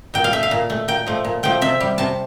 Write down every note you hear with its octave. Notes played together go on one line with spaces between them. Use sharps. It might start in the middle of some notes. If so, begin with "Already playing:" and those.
A#2 G5
F5
A3 E5
F5
A#2
A3
A#2 G5
F3 A3
A#2
F3 A3 G5
C3 E5
G3
C3 A5